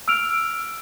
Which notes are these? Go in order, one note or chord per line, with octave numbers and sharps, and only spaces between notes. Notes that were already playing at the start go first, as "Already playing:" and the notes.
E6 F6 D7 F7